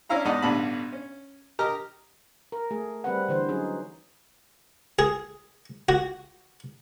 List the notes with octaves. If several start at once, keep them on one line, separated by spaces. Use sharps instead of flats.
C#4 D4 E4 F5 A#5
E2 G#2 D#4 D5 D#5 F#5
A1 G2 B2 D3 B5
C#4
G4 A#4 D#5 A#5 F6
A#4
A3 G#4
G3 C4 B4 F#5
D3 E3 C5
F#3 C#4 D#4 G#4
G#4
F#4